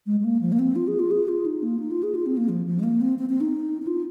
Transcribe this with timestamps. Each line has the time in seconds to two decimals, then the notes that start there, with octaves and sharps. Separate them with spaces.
0.06 G#3
0.20 G#3
0.24 A#3
0.41 F3
0.52 A#3
0.59 C4
0.76 F4
0.88 G#4
0.99 F4
1.11 G#4
1.28 F4
1.46 D#4
1.63 A#3
1.80 D#4
1.91 F4
2.03 G#4
2.15 F4
2.26 C4
2.37 A#3
2.49 F3
2.66 F3
2.79 G#3
2.83 A#3
3.01 C4
3.19 C4
3.29 C4
3.41 D#4
3.82 D#4
3.87 F4